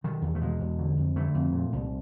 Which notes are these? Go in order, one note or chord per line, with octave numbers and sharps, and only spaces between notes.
B2 D#3
E2
A3
B2 G#3
E2
D3
F2
D3 A3
F2
A#2
C2